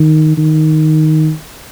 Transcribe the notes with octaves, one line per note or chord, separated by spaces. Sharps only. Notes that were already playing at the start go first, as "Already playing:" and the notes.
Already playing: D#3
D#3